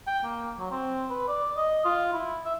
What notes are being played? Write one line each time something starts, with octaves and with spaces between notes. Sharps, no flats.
G5
A#3
F#3
C4
B4
D5
D#5
F4
E4
E5